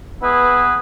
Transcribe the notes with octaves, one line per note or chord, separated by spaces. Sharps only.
B3 E4 G#4 B4